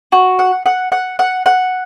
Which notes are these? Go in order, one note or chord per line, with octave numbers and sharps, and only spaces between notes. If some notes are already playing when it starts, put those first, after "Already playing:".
F#4
F#5
F#5
F#5
F#5
F#5